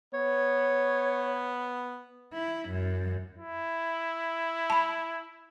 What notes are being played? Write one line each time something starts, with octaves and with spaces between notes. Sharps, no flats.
B3 C#5
E4
F#2
E4
A5 B5